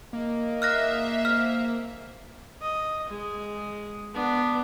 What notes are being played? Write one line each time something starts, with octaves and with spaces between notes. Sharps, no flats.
D#2 A#3 G#4 D#5
E5 F5 F6 F#6 A#6
G#3 C4 F6
D#5
G#3
B3 D4